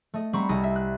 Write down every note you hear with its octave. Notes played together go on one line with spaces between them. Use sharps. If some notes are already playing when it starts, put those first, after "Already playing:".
A3 D#5
G3 C4 F#5 A#5 B5 C#6
C2 D#5 A#6
E5
F#6